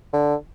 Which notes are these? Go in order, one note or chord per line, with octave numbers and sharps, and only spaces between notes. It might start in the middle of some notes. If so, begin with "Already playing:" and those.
D3